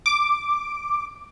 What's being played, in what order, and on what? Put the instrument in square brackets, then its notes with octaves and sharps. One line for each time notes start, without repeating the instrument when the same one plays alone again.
[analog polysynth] D6